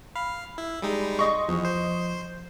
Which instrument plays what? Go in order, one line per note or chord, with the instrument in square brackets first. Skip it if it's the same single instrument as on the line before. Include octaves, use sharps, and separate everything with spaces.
[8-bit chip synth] F5 [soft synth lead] B5
[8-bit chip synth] E4
G3 G#3 D#4
[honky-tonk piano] D#5 C#6 [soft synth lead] C6
[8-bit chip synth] E2 [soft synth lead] F3
[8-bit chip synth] C5